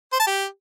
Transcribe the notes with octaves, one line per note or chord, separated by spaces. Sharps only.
C5
A5
G4